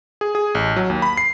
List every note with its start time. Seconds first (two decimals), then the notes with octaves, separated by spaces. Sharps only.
0.21 G#4
0.35 G#4
0.55 A1
0.76 F#3
0.90 D#2
1.02 B5
1.17 C7